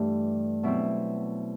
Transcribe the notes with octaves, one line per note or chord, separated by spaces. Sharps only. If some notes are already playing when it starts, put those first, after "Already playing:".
Already playing: G2 E3 A3 D4
B2 F#3 C4 E4